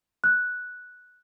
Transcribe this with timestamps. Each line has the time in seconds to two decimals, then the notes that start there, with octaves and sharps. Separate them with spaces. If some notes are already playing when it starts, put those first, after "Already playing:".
0.24 F#6